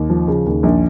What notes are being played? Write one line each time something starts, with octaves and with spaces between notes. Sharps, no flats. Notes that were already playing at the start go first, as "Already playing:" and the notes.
Already playing: D#2
F3
C#3
D#2
A#1